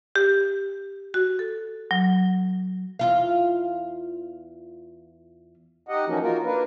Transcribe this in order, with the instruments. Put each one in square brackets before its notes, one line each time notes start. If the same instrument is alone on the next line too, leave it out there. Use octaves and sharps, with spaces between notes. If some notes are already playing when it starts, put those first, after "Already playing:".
[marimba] G4
F#4
A4
F#3
[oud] E2 F4 F5
[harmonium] D#4 G4 D#5 F#5
E3 F3 A#3 C#4 D#4 F#4
A#3 D#4 F4 F#4 A#4
A#3 D4 A#4 B4